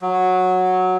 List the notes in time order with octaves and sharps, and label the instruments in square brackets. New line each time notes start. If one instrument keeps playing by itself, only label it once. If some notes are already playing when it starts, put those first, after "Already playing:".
[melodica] F#3